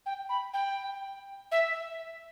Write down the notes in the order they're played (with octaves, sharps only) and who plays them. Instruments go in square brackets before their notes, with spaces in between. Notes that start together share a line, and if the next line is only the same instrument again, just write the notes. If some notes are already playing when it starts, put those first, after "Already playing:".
[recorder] G5
B5
G5
E5